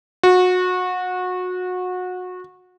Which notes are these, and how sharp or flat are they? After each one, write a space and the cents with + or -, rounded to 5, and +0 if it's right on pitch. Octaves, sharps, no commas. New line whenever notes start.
F#4 -25